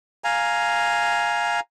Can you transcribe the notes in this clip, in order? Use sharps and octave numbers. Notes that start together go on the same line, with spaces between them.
F5 G#5 A#5